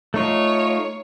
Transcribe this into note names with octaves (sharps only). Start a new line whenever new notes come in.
A3 D#4 F4 C#5